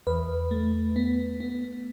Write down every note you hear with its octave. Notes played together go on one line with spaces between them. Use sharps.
E2 B4
A3
B3
B3